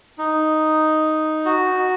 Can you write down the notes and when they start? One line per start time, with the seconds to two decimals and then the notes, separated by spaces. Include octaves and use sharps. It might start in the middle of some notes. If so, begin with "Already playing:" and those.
0.18 D#4
1.45 F#4